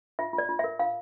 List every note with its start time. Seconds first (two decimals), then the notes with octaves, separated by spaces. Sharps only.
0.19 F4 E5
0.33 F4
0.38 D5
0.49 F4
0.59 A#4 E5
0.79 F4 F5